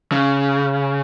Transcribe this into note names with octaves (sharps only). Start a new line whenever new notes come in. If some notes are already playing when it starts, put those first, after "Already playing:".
C#3